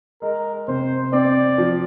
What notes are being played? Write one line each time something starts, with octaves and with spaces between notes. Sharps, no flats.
G#3 A#4
C3 C5
C4 D5
F3